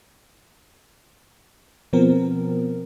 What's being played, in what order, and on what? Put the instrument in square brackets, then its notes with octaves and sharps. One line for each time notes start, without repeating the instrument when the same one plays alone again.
[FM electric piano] B2 F3 B3 C4 A#4